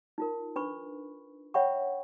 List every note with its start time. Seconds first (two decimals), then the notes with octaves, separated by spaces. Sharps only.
0.18 D#4 F4 A#4
0.56 D4 B4 B5 C#6
1.54 C#5 E5 F#5 G5 B5 C#6